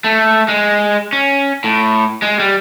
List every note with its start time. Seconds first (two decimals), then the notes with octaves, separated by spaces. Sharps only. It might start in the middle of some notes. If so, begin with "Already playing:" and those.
0.04 A3
0.48 G#3
1.13 C#4
1.64 A2
2.22 G#3
2.39 G3